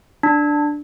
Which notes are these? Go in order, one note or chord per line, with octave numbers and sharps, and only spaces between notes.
D4